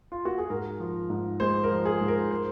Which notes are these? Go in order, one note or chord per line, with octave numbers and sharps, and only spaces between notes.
F4
F#4
G#4
G#2 A#4
F3
G#2
G#3 C5
A#4
F3
G#4
G#2
A#4
C5